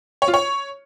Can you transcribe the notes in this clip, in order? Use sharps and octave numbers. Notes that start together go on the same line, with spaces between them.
C#5
F4
C#5